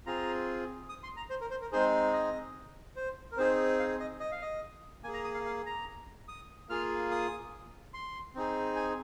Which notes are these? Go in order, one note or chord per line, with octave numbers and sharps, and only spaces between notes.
C4 F4 G#4 A#5
D#6
C6
A#5
C5
A#4
C5
A#4
G#3 C4 D#4 G#4 C5
D#5
C5
A#4
C4 D#4 G#4 C5
F5
D#5
D#5
F5
D#5
A#3 G#4 G#5
A#5
D#6
F5
F5
A#5
D#6
A#3 F4 G#4 F6
D#6
C6
C4 D#4 G#4
G#5